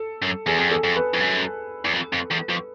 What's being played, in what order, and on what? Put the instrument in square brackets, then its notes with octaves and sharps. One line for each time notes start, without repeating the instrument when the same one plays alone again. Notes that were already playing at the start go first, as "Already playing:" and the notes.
Already playing: [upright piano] A4
[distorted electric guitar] F#2
[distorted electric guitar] E2 [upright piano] G#4
[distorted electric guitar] F2
E2
[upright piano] A4
[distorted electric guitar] F2
[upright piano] B4
[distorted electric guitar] F2
F#2
E2
F2
F2
E2
F2